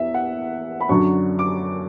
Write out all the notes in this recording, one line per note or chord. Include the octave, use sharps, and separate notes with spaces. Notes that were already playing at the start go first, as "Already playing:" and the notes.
Already playing: E2 E3 E5
F#5
B5
F#2 D3 F#3 C#6
D6